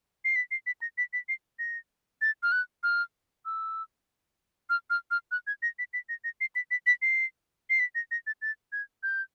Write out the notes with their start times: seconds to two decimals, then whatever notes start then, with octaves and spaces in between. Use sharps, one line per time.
0.25 C7
0.36 B6
0.51 C7
0.67 B6
0.82 A#6
0.98 B6
1.13 B6
1.29 C7
1.59 A#6
2.21 A6
2.43 F6
2.52 F#6
2.83 F6
3.45 E6
4.70 F6
4.90 F6
5.11 F6
5.31 F#6
5.47 G#6
5.62 A#6
5.79 B6
5.93 B6
6.09 A#6
6.24 A#6
6.41 C7
6.55 B6
6.71 B6
6.87 B6
7.02 C7
7.70 C7
7.80 B6
7.95 A#6
8.11 A#6
8.27 A6
8.42 A6
8.72 G#6
9.03 G6